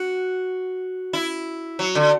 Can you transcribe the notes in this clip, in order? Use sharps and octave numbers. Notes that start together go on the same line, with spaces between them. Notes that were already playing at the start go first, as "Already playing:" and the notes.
Already playing: F#4
E4
F#3
D3